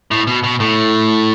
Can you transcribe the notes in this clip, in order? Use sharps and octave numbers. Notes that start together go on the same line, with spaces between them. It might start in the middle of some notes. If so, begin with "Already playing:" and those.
A2
B2
B2
A2